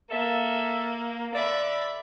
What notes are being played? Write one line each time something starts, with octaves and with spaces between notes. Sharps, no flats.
A#3 A4 E5
D3 D5 E5 B5